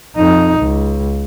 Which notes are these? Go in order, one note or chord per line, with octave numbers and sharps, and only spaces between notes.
F2 D#4
C#2